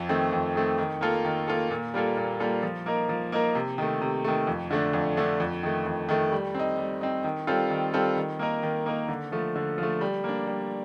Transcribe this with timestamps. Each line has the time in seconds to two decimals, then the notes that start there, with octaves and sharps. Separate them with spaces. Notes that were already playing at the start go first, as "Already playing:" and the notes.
Already playing: F2
0.09 D#3 A3 C4
0.33 F2
0.55 D#3 A3 C4
0.78 D#3
1.01 A#3 F4 A4
1.25 D#3
1.48 A#3 F4 A4
1.71 A#2
1.94 G3 A#3 F4 A4
2.17 A#2
2.40 G3 A#3 F4 A4
2.63 F3
2.86 A#3 D#4 A#4
3.09 F3
3.32 A#3 D#4 A#4
3.55 C3
3.78 D#3 A3
4.01 C3
4.25 D#3 A3
4.47 F2
4.71 D3 A3 D4
4.93 F2
5.17 D3 A3 D4
5.40 F2
5.63 D#3 A3
5.86 F2
6.09 D#3 A3
6.32 G3
6.54 C4 D#4
6.78 G3
7.01 C4 D#4
7.24 D#3
7.47 G3 C4 F4 A4
7.71 D#3
7.94 G3 C4 F4 A4
8.17 D#3
8.39 A#3 D#4 A#4
8.63 D#3
8.86 A#3 D#4 A#4
9.09 D3
9.32 F3 A3
9.56 D3
9.78 F3 A3
10.01 G3
10.24 A#3 D4
10.47 G3